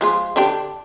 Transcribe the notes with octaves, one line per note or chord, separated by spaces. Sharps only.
F3 G#3 F4
D3 D4 G4